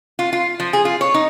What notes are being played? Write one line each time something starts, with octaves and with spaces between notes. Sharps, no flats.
F4
F4
F3
G#4
F4
C#5
D#4